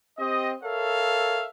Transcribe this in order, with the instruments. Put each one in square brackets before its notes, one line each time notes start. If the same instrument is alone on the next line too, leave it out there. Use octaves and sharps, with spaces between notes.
[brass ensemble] C4 G4 D#5
A4 A#4 C#5 E5 F5